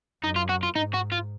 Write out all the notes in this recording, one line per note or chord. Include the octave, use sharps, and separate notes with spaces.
F#2 D#4
F4
F#4
F4
G#2 D#4
F#4
F4